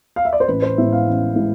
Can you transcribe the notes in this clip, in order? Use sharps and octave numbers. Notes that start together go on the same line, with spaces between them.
F5
E5
D5
C5
A1 B4
C5
A2 G#3 B3 E5
F5
A1
A2 G#3